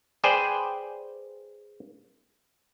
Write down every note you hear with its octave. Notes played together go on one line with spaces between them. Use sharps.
G#4 B4 C5 D5 G5 G#5